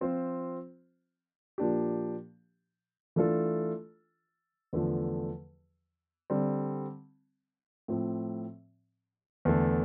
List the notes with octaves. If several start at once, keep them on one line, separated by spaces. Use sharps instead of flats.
F3 C4 F4 C5
A#2 F3 A#3 D4 G4
E3 A3 D4 F4 A4
E2 D3 F3 A3
D3 G3 C4
A2 F3 C4
E2 D3 A3